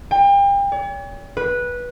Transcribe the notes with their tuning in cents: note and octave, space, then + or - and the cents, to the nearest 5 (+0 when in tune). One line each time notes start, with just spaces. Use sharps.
G5 +35
C#5 +45
B4 -15